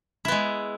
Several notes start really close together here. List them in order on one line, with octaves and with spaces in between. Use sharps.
E4 B3 G#3